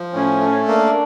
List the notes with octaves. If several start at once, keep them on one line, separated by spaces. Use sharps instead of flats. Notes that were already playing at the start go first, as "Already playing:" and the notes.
Already playing: F3
A2 C#4
A3
A#3 D4